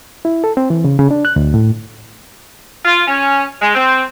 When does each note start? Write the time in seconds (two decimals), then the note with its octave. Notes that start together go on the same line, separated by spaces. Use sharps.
0.25 E4
0.44 A4
0.57 C4
0.70 E3
0.84 C#3
0.99 C#3
1.11 D4
1.25 F#6
1.36 D2
1.54 A2
2.85 F4
3.08 C#4
3.61 G#3
3.75 C4